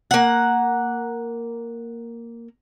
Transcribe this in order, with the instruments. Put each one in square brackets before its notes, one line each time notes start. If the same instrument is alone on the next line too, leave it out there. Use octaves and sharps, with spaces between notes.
[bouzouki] A#3 F#5